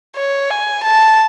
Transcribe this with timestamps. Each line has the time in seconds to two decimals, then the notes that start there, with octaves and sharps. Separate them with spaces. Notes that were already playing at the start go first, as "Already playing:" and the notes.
0.16 C#5
0.50 G#5
0.84 A5